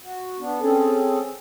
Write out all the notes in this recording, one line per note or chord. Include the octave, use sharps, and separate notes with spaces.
F#4
B3 D4
C4 C#4 G#4 A4